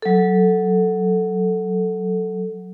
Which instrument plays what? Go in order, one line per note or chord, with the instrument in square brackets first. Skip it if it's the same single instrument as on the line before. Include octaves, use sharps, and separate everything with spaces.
[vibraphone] F#3 A4